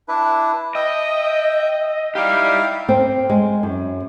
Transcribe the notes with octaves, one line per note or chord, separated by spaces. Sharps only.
D4 E4 B4
D#5 E5 G5
D#4 E4 G4 D5 F5
C4
G#3
F#2